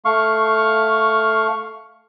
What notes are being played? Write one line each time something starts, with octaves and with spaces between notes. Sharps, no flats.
A3 F5 C#6